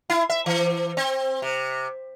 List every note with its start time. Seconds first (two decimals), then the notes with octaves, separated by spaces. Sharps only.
0.10 E4
0.30 E5
0.46 E3
0.97 C4
1.42 C3